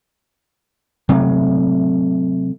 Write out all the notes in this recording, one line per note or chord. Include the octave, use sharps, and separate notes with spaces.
C3 F#3 A3